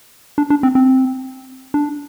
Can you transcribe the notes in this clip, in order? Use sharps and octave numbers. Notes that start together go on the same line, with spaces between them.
D4
D4
C4
C4
D4